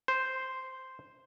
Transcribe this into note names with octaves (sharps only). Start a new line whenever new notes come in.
C5